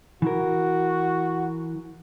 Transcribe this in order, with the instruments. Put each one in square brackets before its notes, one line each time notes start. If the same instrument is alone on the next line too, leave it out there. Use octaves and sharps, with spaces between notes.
[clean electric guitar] E3 A#4 [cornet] F#4